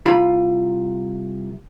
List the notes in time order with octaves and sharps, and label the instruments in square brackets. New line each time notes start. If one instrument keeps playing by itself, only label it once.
[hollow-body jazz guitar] C2 F4 B5